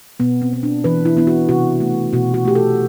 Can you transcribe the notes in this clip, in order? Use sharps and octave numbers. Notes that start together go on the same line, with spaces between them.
B2 B3
C4
B3
D4
E3 B4
E4
B3 E4
F#4
C3 F#4
A3
B2 F#4
F#4
A3 G4
A4